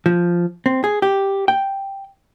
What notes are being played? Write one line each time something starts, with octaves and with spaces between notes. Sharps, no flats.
F3
C4
G#4
G4
G5